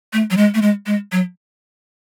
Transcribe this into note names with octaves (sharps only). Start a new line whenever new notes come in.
A3
F#3
G#3
A3
G#3
G#3
F#3